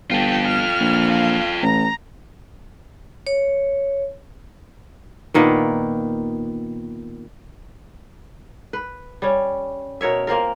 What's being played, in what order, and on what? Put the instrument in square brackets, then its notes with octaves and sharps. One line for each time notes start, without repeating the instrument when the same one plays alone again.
[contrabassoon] G1 [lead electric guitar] F4 A4 [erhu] G5
[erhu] F6
[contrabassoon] A#1
[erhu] F5
[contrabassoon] A1 [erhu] A#5
[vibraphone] C#5
[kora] A#2 D#3 A#3 B3
B4
G3 C#4
B2 A#4 C#5 E5
A#3 C4 F4 A#4